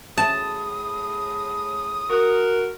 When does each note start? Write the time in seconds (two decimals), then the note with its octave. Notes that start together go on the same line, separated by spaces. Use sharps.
0.17 A2 G#4 A5 D#6
2.10 F#4 A#4